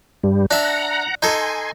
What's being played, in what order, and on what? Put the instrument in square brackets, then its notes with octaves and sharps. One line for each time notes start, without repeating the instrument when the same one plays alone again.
[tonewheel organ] G2 G3
[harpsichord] D4 E5 [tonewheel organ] F#5 A#5
[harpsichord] D#4 A4 [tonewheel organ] G#5 C6